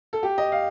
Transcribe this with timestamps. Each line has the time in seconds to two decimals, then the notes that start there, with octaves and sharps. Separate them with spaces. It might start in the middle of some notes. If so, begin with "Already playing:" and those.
0.13 A4
0.23 G4
0.38 D#5
0.52 F5